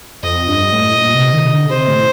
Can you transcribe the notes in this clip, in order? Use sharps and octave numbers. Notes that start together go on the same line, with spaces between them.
F2 D#5
G2
A2
A#2
C3
D#3
D3
C3 C5
A2